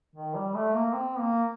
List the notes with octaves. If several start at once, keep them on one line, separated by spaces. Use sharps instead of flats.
D#3
G3
A3
A#3
C4
A#3